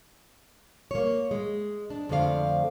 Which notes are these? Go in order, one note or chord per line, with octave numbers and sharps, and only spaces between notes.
A#3 C#5
G#3
D4
F2 D3 F3 A3 D5 F5